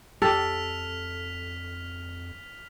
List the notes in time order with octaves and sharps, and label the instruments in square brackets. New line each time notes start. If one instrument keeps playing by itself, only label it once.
[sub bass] F2 [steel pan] G4 [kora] A4 [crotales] F6 B6 F7